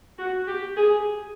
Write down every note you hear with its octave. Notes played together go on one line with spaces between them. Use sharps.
F#4
G4
G#4